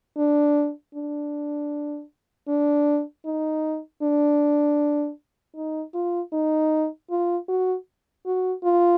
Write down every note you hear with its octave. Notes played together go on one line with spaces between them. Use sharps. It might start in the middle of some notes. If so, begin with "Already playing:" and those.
D4
D4
D4
D#4
D4
D#4
F4
D#4
F4
F#4
F#4
F4